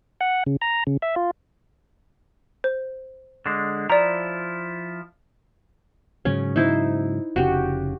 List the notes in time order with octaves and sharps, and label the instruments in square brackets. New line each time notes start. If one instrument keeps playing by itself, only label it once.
[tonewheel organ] F#5
C#3
A#5
C#3
E5
F4
[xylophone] C5
[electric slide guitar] D3 G#3
[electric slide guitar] F3 E4 [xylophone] D5 A#5
[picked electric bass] G#2 C#3 F#3 [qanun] C#4
[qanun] D#4 E4 C5
[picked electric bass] F1 C#3 [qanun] F#4 G4